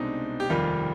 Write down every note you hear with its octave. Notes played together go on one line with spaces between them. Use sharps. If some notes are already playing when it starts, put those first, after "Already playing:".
Already playing: C2 B2 G#3 C4 D4 D#4
G4
F1 D#2 D#3 G3 F4